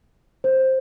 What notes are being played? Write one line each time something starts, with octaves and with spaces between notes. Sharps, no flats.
C5